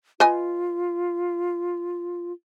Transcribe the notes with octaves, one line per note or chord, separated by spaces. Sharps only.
F4 B4 D#5 G#5